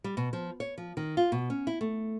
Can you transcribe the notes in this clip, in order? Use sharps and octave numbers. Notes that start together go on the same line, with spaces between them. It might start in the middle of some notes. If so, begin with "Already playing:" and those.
G3
B2
F3
C#5
F3
D#3
F4
B2
C#4
E4
A3